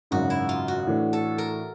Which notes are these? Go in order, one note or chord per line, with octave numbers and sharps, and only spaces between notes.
G#1 F#2 C#3 F#4
E4
F4
F#4
A2 E3 A3 D4
A4
A#4